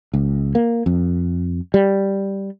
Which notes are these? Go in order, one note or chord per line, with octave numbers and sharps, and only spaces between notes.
C#2
A#3
F2
G3